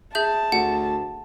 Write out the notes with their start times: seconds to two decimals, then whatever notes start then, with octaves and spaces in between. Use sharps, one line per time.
0.15 G#4 E5 A5 G6
0.52 D2 F#5